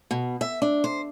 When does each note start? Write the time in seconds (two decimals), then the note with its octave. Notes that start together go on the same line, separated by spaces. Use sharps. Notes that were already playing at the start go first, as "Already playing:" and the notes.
0.11 B2
0.41 E5
0.62 D4
0.84 C5